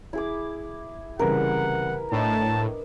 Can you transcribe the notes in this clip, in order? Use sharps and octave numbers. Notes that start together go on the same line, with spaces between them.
E4 G#4 D6
C2 C#3 E3 A#4 B4 F#5
A2 D4 D#5 A5